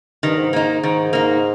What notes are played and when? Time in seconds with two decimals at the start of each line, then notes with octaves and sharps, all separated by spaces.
0.23 G2 D#3
0.38 G#2
0.53 G#2 A#3 D#4
0.83 G#2 D#3
1.13 A#3 D#4